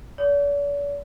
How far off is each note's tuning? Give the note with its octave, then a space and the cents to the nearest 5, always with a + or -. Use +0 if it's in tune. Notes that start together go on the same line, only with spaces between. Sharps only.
D5 -45